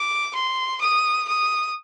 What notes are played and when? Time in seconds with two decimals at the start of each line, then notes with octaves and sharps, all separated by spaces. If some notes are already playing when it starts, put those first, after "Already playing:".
Already playing: D6
0.35 C6
0.81 D#6
1.28 D#6